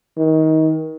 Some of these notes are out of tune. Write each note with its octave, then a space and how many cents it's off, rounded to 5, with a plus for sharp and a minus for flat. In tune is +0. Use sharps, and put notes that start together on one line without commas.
D#3 +25